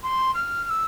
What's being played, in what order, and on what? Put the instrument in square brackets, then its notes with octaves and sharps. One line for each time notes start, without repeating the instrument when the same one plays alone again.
[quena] C6
F6
F6
E6